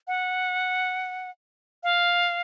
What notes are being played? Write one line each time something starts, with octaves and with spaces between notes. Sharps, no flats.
F#5
F5